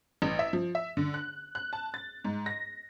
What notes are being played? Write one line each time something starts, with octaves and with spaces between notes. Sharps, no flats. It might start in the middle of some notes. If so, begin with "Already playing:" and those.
A1
E5
F3
E5
D3
F#6
F#6
A5
A6
G#2
A#6